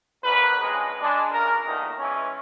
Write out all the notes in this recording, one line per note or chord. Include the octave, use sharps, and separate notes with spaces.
A#1 E2 A#4 B4
G2 C#3 G#3
G#3 D4
C#2 C#3 A#4
E2 A#2 D#3 A3 D#4
E3 G#3 C#4